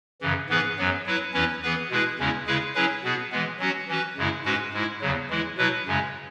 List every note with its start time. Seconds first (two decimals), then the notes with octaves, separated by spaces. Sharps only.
0.21 F#2 C#3 E3
0.49 G#2 E3 B3 G#4 B4
0.78 F#2 F#3 B3
1.06 F#3 E4 B4
1.34 E2 E3 C#4 E4 B4
1.63 E3 B3 G#4 B4
1.91 B2 G#3 E4 G#4 B4
2.19 E2 C#3 G#3 C#4 E4
2.47 C#3 G#3 E4 G#4 B4
2.75 F#3 C#4 E4 G#4 B4
3.04 B2 B3 G#4
3.32 E3 G#3 B3
3.59 F#3 C#4 F#4
3.88 E3 C#4 F#4 B4
4.17 F#2 C#3 G#3 E4
4.45 G#2 G#3 C#4 F#4 B4
4.73 G#2 G#3 E4
5.01 E2 C#3 F#3
5.30 E3 G#3 E4
5.57 B2 F#3 E4 B4
5.86 F#2 C#3 G#3 C#4